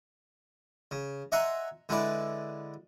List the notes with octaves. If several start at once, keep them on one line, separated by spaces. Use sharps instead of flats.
C#3
D#5 E5 F#5 G#5 A#5 C6
D3 G#3 E4 B4 D5